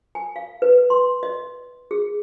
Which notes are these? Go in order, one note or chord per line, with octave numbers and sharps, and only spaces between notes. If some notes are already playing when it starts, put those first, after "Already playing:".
G#5
F5
B4
C6
D#5
G#4